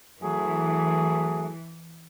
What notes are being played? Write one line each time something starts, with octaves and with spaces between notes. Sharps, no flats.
E3 F#3 A3 G#4